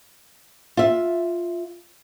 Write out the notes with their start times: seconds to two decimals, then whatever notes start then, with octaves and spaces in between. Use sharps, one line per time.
0.77 F4 E5